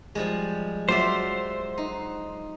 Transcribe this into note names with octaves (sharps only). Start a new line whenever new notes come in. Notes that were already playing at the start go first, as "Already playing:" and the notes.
F3 G3 G#3
F#3 F4 C5 D5 E5
D#4